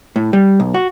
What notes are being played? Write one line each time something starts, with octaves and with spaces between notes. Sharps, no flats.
A2
G3
B1
F#4